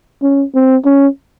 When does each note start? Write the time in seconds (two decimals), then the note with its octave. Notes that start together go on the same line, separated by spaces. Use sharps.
0.22 C#4
0.55 C4
0.85 C#4